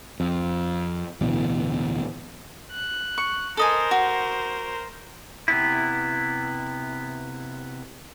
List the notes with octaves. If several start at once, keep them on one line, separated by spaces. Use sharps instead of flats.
F2
D1 B2 E3
F#6
C#6
A4 A#4 C5 D#5 G#5
F#4
C3 B3 E4